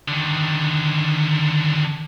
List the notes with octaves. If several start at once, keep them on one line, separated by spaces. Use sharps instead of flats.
D3 D#3